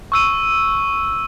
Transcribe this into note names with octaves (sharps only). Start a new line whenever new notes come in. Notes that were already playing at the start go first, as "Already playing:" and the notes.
C#6 E6 D#7